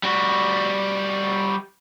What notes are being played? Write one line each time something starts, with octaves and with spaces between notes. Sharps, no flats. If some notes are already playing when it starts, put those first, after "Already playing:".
G3 F#4